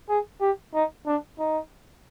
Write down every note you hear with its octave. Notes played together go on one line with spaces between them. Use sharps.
G#4
G4
D#4
D4
D#4